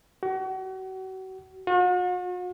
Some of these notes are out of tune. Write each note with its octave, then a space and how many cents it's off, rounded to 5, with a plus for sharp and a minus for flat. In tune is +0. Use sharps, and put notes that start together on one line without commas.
F#4 +35
F#4 -45